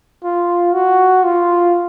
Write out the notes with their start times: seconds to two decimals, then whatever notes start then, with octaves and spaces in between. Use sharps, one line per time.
0.24 F4
0.74 F#4
1.25 F4